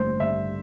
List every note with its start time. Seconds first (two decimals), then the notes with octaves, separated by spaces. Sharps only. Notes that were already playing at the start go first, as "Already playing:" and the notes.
Already playing: A1 G2 D3 C5
0.20 G2 E5